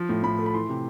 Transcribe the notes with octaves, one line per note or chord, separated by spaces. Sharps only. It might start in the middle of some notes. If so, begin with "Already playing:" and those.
Already playing: F3
A2
A2 B5
A3
B5
E3 C6
C3